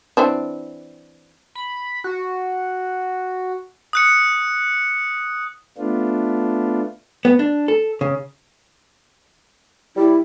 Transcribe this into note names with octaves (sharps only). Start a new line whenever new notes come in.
E3 C4 D4
B5
F#4
D#6 F#6 C#7
A3 B3 D4 F4
B3
D4
A4
C#3
G3 E4